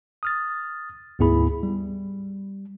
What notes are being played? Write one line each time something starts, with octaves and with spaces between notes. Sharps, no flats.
D#6 F6 A6
D2 G#2 B3 E4 G#4 B5
G3